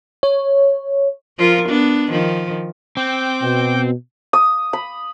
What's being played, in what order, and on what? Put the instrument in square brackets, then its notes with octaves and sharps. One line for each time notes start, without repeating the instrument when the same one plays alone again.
[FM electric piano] C#5
[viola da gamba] F3 F4 A#4
B3 D4
D#3 F3
[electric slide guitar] C4 [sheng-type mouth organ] G5 D6 G6
[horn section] B2
[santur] D#6
B5